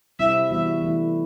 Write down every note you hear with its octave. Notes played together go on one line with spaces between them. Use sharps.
C3 G3 C4 E4 E5
E3 G3 B3 F#4 E5
E3 A3 E4